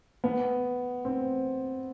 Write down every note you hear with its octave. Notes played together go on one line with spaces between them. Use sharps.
B3
C4